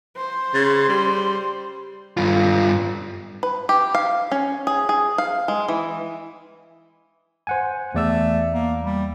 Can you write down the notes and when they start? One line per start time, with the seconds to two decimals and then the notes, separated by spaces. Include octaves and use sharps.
0.17 C5
0.54 C#3
0.88 G3
2.17 G2 F4
3.43 B4
3.69 G4
3.94 F5
4.31 C#4
4.67 G#4
4.89 G#4
5.18 F5
5.48 G#3
5.68 E3
7.47 C5 F#5 G#5
7.95 E2 A3 D5 E6
8.53 A#3
8.82 G3